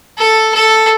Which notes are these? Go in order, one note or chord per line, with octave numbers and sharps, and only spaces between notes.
A4
A4